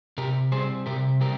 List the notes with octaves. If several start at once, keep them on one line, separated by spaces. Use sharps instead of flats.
C3 G4 A#4
G3 C4 G#4 C5
C3 G4 A#4
G3 C4 G4 A#4